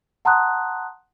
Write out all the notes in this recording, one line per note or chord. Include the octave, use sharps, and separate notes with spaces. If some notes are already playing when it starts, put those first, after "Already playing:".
F#5 A5 A#5 C6 D#6 F#6